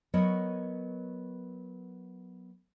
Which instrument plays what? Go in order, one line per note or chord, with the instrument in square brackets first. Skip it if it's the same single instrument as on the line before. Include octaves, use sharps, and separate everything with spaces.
[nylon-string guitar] F#3 B3 A#4 C#5 D#5